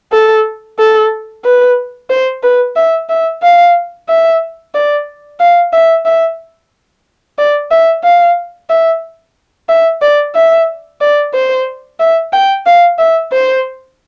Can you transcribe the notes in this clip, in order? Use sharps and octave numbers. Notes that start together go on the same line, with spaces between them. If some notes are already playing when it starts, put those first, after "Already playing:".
A4
A4
B4
C5
B4
E5
E5
F5
E5
D5
F5
E5
E5
D5
E5
F5
E5
E5
D5
E5
D5
C5
E5
G5
F5
E5
C5